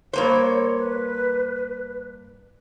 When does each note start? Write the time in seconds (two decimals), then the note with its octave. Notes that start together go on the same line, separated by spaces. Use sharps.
0.13 G2 A#3 C5 C#5
0.78 B4